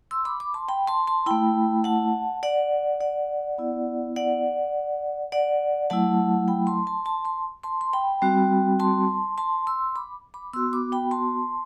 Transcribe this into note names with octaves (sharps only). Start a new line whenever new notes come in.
C6 E6
B5 D6
B5 D6
A5 C6
G5 B5
A5 C6
A5 C6
A3 E4 G5 B5
F#5 A5
D5 F#5
D5 F#5
B3 E4
D5 F#5
D5 F#5
F#3 A3 E4 F#5 A5
G5 B5
A5 C6
A5 C6
A5 C6
A5 C6
A5 C6
C6
G5 B5
G3 C4 F#4
A5 C6
A5 C6
C6 E6
B5 D6
B5 D6
B3 F#4 C6 E6
B5 D6
G5 B5
A5 C6